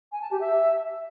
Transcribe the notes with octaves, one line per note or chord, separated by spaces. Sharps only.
G#5
A5
G4
E5